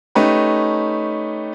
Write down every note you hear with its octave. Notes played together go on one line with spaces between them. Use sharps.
A3 C#4 D#4 G4 B4